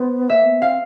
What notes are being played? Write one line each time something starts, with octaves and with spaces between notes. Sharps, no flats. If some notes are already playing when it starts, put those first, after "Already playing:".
Already playing: B3 C5
A#3 E5
B3
C4 F5